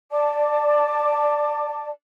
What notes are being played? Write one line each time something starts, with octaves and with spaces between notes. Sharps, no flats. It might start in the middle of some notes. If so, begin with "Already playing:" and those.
D5 A5 D6